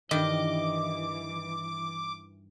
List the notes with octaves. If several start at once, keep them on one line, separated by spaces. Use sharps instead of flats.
G2 D#3 E3 D#5 D6